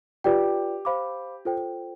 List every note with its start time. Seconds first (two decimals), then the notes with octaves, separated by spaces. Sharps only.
0.24 F4 G4 B4 D5 G5
0.85 C5 F5 B5 D6
1.45 F4 A4 C5 G5